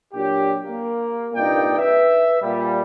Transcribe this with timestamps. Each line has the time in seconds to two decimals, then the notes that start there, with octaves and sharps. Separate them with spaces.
0.13 A#2 F#3 D4 G4
0.66 A#3
1.35 C2 G2 A#2 D#4 D5 G5
1.78 B4 E5
2.42 A#2 G3